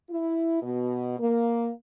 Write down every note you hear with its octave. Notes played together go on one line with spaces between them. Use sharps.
E4
B2
A#3